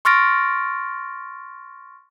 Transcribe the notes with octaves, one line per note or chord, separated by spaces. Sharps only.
C6 C#6 F6 A6 A#6 D7